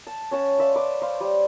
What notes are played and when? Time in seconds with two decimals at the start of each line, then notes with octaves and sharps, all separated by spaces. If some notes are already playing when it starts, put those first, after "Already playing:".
0.07 A5
0.31 C#4 F#5 A5
0.58 D5 E5 F5 C6
0.76 B4 D6
1.02 C5 F5
1.21 G3